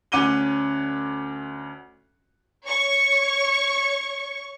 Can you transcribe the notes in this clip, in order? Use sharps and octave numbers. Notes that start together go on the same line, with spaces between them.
D2 C#4 F#5 D6 D#7 G7
C#5 C#6